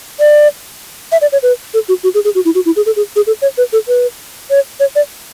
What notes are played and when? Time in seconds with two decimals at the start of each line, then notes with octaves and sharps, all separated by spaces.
0.20 D5
1.12 E5
1.22 D5
1.32 C#5
1.43 B4
1.74 A4
1.89 F#4
2.03 F#4
2.14 G#4
2.25 G#4
2.35 F#4
2.45 E4
2.55 F#4
2.66 E4
2.76 G#4
2.86 A4
2.96 G#4
3.16 G#4
3.27 A4
3.42 C#5
3.58 B4
3.73 A4
3.88 B4
4.50 C#5
4.80 C#5
4.96 D5